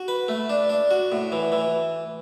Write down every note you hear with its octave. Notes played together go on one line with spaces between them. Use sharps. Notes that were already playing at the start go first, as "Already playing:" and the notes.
Already playing: F#4
B4
A3
D4
D4
F#4
A2
E3
E3